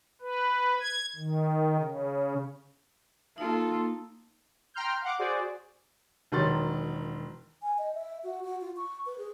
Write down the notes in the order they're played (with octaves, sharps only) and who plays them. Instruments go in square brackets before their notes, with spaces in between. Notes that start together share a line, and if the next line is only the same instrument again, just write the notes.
[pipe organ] B4
G#6
D#3
C#3
[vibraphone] A#3 D#4 [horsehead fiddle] F4 A4
[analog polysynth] G5 A#5 C6 F6 G6
F5 F#5 D6
F#4 G#4 C5 D5
[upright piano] E1 D#3 F#3 C6 A6
[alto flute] G#5
D#5
E5
F#4
F#4
F4
C#6
B4
G#4